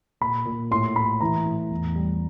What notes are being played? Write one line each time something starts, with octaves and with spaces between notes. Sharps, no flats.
A#2 B5
A#2
A2 C6
A2 B5
E3 A#5
A2
E2
G3